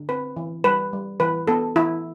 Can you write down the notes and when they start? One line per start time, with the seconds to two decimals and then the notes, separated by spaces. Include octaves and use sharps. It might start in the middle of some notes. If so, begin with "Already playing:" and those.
Already playing: D3
0.09 C4 B4
0.37 E3
0.64 G3 B4
0.93 G3
1.20 E3 B4
1.47 B3 A4
1.76 E3 E4